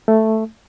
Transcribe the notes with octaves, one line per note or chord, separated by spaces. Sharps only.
A3